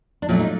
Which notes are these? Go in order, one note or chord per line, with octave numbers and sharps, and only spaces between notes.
D4
A#2 F#3 A3 C#4
D#4